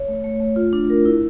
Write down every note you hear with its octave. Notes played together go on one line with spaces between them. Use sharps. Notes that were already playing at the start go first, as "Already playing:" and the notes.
Already playing: C#5
A3
A3
A3
F4
D4
A#4
E4